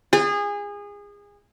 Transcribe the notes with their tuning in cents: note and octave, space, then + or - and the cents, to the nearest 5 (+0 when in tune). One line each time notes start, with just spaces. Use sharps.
G#4 -25